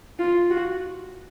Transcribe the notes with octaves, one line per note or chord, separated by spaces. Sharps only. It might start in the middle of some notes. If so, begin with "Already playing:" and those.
F4
F#4